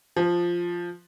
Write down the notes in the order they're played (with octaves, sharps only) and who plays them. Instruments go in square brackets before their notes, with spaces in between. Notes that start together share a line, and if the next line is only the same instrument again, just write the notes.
[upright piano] F3